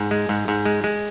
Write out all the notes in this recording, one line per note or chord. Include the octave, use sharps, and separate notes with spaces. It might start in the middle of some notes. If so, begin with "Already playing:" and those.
Already playing: G#2
G#3
G#2
G#2
G#3
G#3